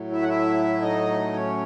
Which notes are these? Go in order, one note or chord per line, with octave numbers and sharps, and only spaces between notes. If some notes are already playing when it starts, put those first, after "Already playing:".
Already playing: A2 F#3 A3
E4 E5
F#5
E4 E5
D#4 D#5
C#4 C#5